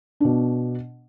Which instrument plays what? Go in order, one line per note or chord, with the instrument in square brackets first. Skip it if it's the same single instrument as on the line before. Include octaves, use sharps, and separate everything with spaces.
[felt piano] B2 D4